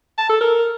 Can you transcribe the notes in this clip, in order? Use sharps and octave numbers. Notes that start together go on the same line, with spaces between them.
A5
A4
A#4